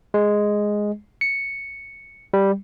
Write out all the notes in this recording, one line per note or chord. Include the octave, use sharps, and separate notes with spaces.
G#3
C#7
G3